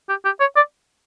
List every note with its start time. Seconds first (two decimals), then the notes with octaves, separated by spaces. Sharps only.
0.09 G4
0.25 G4
0.40 C#5
0.56 D5